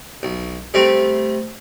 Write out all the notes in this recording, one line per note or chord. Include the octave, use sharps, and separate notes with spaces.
B1
C3 G3 A3 C4